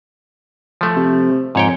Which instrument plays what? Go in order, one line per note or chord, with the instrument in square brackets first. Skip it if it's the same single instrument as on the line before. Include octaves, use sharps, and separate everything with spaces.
[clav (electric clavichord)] F3 A3
[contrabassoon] C3
[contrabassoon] F2 [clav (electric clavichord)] G#2 C#5 G5